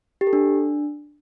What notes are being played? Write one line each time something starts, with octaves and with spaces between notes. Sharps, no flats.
G4
A4
D4